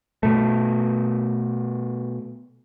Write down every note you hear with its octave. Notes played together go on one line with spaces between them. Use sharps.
B2 A3